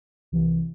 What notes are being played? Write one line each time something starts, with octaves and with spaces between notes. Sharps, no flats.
C2 C3 E3